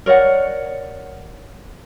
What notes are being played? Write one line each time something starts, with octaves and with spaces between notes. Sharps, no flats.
A#4 C#5 D5 F#5